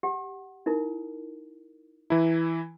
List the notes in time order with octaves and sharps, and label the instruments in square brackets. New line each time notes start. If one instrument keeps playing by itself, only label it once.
[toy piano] G4 F#5
D#4 E4 A#4
[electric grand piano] E3 E4 [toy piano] A#5